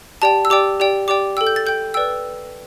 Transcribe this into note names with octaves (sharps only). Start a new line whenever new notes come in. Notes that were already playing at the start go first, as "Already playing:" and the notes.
G4 D5 G5 A5
E6
G4 D5 G5 D6
G4 D5 G5
G4 D5 G5 D6
A4 G5 E6
G6
A6
A4 G5 G6
B4 D5 G5 E6